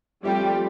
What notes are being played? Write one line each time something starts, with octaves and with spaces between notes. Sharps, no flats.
F3 G3 A3 C4 F4 G4